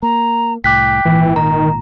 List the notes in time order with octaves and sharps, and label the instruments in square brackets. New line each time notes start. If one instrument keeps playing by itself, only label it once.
[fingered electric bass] A#3 [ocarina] A#5
[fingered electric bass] C2 A2 [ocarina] G5 [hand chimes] D6 F#6 B6
[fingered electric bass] G#1 A#2 [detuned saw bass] E3
[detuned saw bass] D#3 [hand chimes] A#5